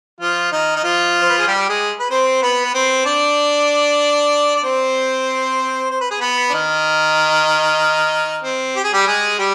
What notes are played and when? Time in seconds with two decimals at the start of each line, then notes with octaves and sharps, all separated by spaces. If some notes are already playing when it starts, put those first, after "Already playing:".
0.21 F3 F4
0.52 D#3 D#4
0.76 D#4
0.84 F3 F4
1.21 C5
1.30 B4
1.38 G#4
1.47 G3 G4
1.69 G#3 G#4
1.99 B4
2.10 C4 C5
2.43 B3 B4
2.65 B4
2.74 C4 C5
3.06 D4 D5
4.56 D5
4.63 C4 C5
5.91 C5
6.00 B4
6.11 G#4
6.20 B3 B4
6.50 D4
6.54 D#3 D#4
8.44 C4
8.76 G4
8.84 G#4
8.93 G3 G4
9.07 G#3 G#4
9.38 G3 G4